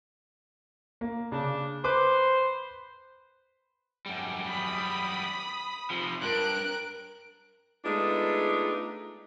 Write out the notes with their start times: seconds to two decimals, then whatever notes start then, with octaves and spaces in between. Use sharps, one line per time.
1.01 A#3
1.32 C#3 D4
1.84 B4 C5 B5 D6
4.06 F#2 G3
4.46 B5 D#6
5.90 C3 F3
6.22 G2 A#4 F#6 D7
7.84 G#3 A3 B3 D4 D#4 F4